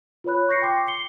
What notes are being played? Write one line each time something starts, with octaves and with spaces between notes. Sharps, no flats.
F4 B4 C#5 B5 F#6
C#6 G6 A#6 C7 C#7
G5 C6 D6
C7 C#7 G7